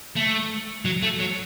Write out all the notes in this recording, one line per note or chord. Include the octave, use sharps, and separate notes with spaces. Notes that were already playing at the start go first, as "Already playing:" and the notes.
A3
F#3
A3
F#3